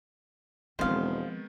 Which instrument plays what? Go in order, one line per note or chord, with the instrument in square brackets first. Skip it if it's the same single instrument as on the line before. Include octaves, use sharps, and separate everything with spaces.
[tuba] E1 [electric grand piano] D#3 G#3 B3 [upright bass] F3 C4 [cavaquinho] C5 F5